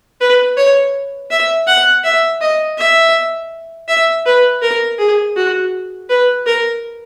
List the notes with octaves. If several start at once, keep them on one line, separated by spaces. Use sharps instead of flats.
B4
C#5
E5
F#5
E5
D#5
E5
E5
B4
A#4
G#4
F#4
B4
A#4